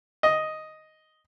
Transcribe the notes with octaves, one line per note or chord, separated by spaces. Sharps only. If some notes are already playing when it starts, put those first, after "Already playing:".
D#5